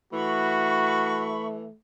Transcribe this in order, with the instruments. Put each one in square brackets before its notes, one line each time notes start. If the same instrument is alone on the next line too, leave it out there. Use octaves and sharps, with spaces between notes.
[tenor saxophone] E3 [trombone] A3 [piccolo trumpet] F#4 [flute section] B5 C#6